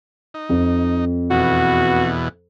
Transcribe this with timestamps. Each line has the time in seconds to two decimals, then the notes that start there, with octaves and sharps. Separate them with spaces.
0.34 D#4
0.50 F2
1.31 E2 B2 F#4